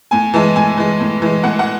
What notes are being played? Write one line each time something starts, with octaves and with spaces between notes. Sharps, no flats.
A2 G#5
E3 G#3 A5
A2 G#5
E3 G#3
A2
E3 G#3
A2 F#5
F#5